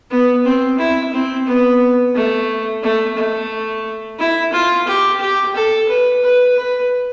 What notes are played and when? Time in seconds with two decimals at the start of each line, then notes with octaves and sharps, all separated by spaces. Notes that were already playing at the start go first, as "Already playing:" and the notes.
0.10 B3
0.45 C4
0.78 E4
1.13 C4
1.46 B3
2.14 A3
2.82 A3
3.17 A3
4.19 E4
4.52 F4
4.86 G4
5.20 G4
5.54 A4
5.88 B4
6.22 B4
6.56 B4